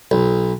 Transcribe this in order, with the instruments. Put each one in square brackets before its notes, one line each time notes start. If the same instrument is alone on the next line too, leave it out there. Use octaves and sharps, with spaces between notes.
[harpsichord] B1